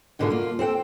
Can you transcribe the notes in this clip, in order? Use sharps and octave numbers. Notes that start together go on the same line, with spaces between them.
G#2 B2 D3 D#3 G#3 F4
A#3 F4
C4 A4 F#5 G5